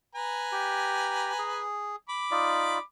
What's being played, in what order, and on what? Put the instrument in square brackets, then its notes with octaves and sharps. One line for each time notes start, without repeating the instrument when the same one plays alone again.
[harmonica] B4 G#5 A#5
[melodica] G4
G#4
[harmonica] B5 D6
[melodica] D#4 F4 D5